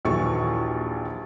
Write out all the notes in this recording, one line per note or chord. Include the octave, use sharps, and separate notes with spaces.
A#1 D#2 E3 F#3 A4 C#6